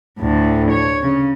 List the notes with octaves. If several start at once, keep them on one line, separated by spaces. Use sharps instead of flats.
D2 A2
C#5
C#3